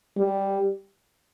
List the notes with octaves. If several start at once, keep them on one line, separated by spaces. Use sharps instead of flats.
G3